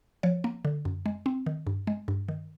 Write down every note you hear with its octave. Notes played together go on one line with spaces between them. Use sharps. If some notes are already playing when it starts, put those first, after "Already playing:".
F3 C#5
A#3
D3
F#2
G#3
C4
D#3
G2
G#3
G2
D#3